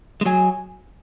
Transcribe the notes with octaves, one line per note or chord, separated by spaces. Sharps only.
G#3
F#3 G#4 D#5 G#5